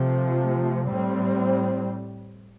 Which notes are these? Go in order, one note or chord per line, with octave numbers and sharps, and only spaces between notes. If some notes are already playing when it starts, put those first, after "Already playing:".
Already playing: C3 F3 A3
A2 G3 C4